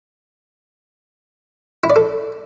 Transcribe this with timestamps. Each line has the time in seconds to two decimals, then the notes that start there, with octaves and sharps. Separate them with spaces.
1.84 E4
1.90 D5
1.96 A4